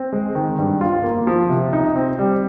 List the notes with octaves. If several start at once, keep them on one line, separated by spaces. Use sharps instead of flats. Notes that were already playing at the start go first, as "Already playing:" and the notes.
Already playing: C4
G#3
D#3
G2
F4
A#3
F3
C3
D#4
C4
G3